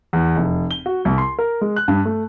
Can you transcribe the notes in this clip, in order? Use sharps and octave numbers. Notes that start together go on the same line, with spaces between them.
E2
F1
G7
F#4
C2
C6
A#4
G#3
F#6
G2
A3